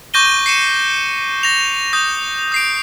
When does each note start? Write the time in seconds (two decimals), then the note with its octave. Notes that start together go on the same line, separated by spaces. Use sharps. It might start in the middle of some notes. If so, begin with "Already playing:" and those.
0.14 C#6 D6 G6 A#6 D#7 G7
0.46 C7 C#7 D#7 E7
1.43 A#6 F7
1.93 D#6 G6 A#6
2.52 D#6 C7 D7